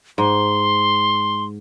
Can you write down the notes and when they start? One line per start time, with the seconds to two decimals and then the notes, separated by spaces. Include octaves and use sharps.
0.18 G#2 C6